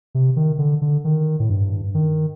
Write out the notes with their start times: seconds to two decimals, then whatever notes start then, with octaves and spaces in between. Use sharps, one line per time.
0.15 C3
0.36 D#3
0.59 D3
0.82 D3
1.04 D#3
1.40 A2
1.50 G2
1.95 D#3